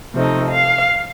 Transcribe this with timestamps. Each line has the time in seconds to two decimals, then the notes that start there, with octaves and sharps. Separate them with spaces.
0.15 C3 F3 A3 D#4
0.51 F5